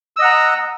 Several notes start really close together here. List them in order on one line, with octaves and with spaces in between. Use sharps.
E6 D#5 F#5 A#5